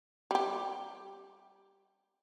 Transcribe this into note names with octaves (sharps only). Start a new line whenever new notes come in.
G3 G4